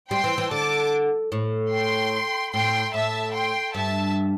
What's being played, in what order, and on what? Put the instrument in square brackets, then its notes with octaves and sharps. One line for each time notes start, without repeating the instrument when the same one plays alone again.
[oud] G3 [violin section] G5 C6
[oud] E3
E3
[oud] D3 [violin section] A5 D6
[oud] A2
[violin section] G5 C6
[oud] A2 [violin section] G5 C6
[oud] A2 [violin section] E5 A5
[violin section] G5 C6
[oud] G2 [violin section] E5 A5